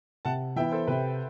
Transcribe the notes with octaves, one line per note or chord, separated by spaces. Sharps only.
C3 F#5 A5
E3 B3 E4 E5 G5
A4 C5
C3 B4